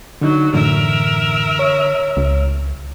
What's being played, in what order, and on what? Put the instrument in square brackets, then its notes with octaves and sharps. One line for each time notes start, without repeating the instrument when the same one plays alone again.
[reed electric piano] D3 D#4 [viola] F#3
[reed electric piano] F#2 A2 E3 [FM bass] D3 [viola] A#4 E5
[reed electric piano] C#5
[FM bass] C#2